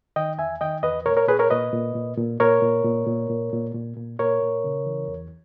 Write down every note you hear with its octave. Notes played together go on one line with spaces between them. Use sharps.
D#3 D#5 G5
E2 E5 G#5
D#3 D#5 G5
E2 B4 D#5
A#2 A#4 C#5
A#4 C#5
A#2 G#4 B4
A#4 C#5
A#2 B4 D#5
A#2
A#2
A#2
A#2 A#4 C#5
A#2
A#2
A#2
A#2
A#2
A#2
A#2
A#2 A#4 C#5
A#2
C#3
E3
E2